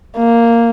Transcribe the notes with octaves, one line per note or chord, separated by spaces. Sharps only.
A#3